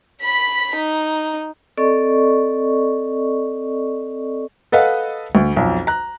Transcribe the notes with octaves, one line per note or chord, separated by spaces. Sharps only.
B5 B6
D#4
C4 A4 D5 D#5 C#6
A4 B4 D#5 F5 F#5
D2
B1 F2
A#5 F#6